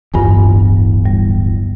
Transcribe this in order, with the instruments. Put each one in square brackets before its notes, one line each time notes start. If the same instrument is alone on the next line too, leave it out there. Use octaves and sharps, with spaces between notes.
[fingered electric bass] D1 G1 E2 [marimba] G2 F4 G#5
[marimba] G3